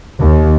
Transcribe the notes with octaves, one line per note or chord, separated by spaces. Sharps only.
D#2